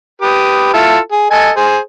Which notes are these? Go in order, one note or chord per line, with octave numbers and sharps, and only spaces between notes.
G4 B4 D#6
E4 F4 A4
G#4
A4 D#5 G#5
G#4 C5